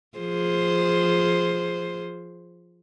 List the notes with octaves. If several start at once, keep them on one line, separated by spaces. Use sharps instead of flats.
F3 G#4 C5